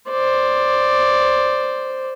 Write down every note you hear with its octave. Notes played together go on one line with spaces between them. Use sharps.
C5 D5